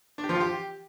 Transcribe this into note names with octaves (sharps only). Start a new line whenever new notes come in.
D4
G4
F3
F4
G4